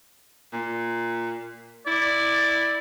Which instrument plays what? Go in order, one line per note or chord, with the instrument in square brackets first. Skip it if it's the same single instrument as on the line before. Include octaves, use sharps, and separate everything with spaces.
[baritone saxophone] A#2
[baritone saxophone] E4 [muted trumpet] D5